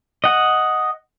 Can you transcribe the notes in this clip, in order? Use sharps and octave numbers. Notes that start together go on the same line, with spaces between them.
D#5 F#5